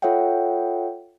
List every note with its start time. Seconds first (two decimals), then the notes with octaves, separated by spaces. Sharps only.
0.02 F4 A4 C#5 E5 F#5 G5